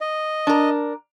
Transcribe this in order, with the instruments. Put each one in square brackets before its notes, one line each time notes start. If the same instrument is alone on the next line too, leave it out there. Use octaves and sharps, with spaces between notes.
[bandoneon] D#5
[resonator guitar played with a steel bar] D4 A#4